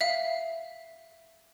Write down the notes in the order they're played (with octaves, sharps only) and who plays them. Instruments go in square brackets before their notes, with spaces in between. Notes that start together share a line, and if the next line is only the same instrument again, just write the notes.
[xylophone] E5 F5